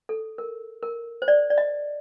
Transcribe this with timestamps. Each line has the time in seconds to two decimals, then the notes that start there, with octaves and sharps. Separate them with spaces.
0.09 A4
0.38 A#4
0.83 A#4
1.22 C5
1.28 D5
1.50 D5
1.58 D#5